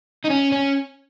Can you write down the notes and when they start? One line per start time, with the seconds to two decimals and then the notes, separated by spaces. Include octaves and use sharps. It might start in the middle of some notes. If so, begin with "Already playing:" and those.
0.25 D#4
0.30 C#4
0.52 C#4